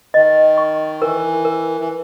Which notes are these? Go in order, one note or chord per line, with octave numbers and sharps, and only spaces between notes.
D#3 D#5
C#6
E3 A#4
A#4
E3